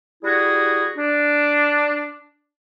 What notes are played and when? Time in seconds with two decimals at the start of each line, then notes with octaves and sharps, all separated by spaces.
0.23 G3 E4 F#4 G#4
0.97 D4